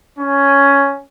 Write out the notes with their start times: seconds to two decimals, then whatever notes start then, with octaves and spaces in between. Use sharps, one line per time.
0.18 C#4